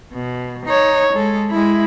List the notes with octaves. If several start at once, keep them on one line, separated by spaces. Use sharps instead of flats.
B2
D#4 C#5
G#3 A4
G#3 E4